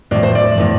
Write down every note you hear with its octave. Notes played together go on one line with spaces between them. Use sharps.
A2 F3 D5
C5
D5
A2 F3